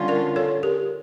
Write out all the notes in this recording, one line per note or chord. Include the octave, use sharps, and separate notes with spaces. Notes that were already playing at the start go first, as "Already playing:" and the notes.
Already playing: D3 G3 C#4 F4
A#4 D5
A4 C#5
G4 A#4